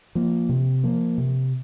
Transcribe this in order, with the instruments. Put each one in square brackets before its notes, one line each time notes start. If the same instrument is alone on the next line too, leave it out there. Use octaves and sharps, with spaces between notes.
[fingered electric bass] F3 A#3
C3
F3 A#3
C3